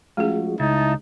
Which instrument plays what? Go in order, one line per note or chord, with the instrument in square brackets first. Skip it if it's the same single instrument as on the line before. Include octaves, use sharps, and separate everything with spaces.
[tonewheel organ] F3 G#3 F#4 [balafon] A3 C#4 G#4
[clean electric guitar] C#2 [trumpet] D#4 [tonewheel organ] E4 A5